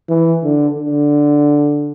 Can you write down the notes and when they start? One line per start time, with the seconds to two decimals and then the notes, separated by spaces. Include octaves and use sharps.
0.09 E3
0.44 D3
0.78 D3